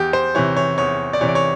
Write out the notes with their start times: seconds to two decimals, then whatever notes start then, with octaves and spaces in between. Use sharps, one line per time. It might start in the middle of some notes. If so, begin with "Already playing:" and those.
Already playing: E2 G4
0.13 C5
0.35 C3 E3 C#5
0.56 C#5
0.78 E2 C#5
1.13 D5
1.21 C3 E3 C#5
1.28 D5
1.35 C#5